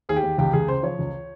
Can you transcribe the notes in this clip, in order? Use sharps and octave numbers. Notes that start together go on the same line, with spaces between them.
D#2 G#4
G4
D#2
C#2 G4
C#2 G#4
C#3 C5
F3 C#5
C#2